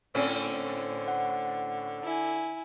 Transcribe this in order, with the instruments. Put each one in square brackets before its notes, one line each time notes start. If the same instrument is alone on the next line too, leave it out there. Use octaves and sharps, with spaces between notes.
[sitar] A2 C4 C#4 [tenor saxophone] D3
[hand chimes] F#5
[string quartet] E4 G#5